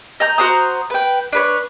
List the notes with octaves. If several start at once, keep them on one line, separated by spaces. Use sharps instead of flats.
D#5 A#5 G6
F#4 C5 A#5 D#6
B4 G5
D4 B4 C#5